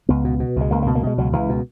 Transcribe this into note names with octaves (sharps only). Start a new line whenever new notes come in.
C#2 B3
B2
B2
C#2 G#3
C#2 A#3
A#3
B2
A#3
B2 G#3
C#2 F#3
C#2 E3
B2